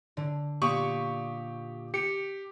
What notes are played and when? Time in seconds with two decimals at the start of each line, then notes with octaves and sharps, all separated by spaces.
0.17 D3
0.62 A#2 G4 C#6 D#6
1.94 G4 C#7